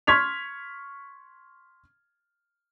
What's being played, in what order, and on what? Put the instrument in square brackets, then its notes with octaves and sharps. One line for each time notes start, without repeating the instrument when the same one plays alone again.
[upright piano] C6 C#6 F6 G#6 B6 F7